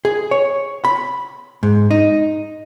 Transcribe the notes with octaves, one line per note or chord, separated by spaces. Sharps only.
G#4
C#5
B5
G#2
D#4